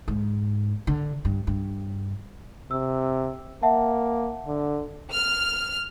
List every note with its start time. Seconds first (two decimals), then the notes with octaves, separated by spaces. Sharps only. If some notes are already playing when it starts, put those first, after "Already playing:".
0.08 G#2
0.87 D3
1.25 G2
1.47 G2
2.71 C3 E6
3.63 A#3 E5 F#5 A5
4.47 D3
5.11 F6